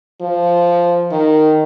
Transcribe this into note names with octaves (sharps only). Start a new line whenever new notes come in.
F3
D#3